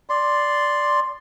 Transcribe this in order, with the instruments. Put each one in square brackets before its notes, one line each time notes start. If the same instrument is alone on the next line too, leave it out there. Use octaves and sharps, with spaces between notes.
[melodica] D5 C6